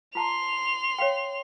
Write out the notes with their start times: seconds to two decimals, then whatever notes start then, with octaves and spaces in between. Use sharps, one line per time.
0.15 F4 A5 A#5 C6 F7
0.98 C#5 F5 G5